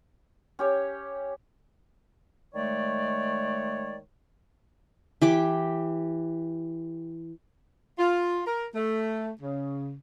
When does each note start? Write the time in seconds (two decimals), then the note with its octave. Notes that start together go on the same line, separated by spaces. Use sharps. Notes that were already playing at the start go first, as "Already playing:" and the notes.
0.59 C#4 G4 C#5
2.54 D#3 G#3 A3 C#5 D5
5.22 E3 G4 D6
7.99 F4
8.46 A#4
8.74 A3
9.41 C#3